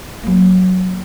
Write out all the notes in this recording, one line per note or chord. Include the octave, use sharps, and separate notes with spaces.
F#3 A#3